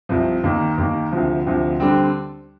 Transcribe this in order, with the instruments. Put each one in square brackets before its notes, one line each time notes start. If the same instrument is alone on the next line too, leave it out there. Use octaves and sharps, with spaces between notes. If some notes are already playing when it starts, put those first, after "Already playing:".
[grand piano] C2 C3 F3
D#2 D#3 A#3
D#2 D#3 A#3
D2 C3 F3
D2 C3 F3
D3 G3 C4